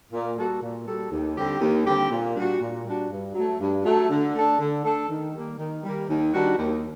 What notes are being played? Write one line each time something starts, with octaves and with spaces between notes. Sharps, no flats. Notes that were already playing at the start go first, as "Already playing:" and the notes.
A#2
G3 A#3 F#4 A4
A#2
G3 A#3 F#4 A4
D#2
D3 G3 C4 G4
D#2
D3 G3 C4 G4
A#2
G3 D4 F#4
A#2
G3 D4 F#4
G2
F#3 A3
G2
F#3 A3
D3
A3 D4 A4
D3
A3 D4 A4
D#3
G3 A#3
D#3
G3 A#3
D#2
D#3 G3 D4 F#4
D#2